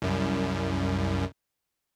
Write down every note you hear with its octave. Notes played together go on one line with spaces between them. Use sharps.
C2 F#2